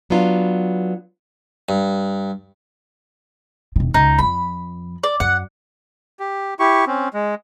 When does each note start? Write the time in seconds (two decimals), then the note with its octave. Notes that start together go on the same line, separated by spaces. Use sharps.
0.10 F#3 B3 D4 F4
1.69 G2
3.76 E1 D#3
3.94 C#2 D#4
4.19 F2 F3 B5
5.04 D5
5.20 F#2 F#5
6.19 G4
6.59 E4 G4 C#6
6.87 C4 C#4
7.14 G#3